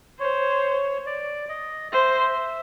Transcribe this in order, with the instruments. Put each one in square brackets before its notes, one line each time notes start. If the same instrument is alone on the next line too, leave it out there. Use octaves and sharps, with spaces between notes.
[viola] C5 [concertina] C#5
[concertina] D5
D#5
[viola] C5 [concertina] E5